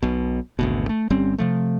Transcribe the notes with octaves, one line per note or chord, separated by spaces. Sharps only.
B1 B2
G#1 D2 B2
A3
G1 G3 C4 C#4
C3 F3 A3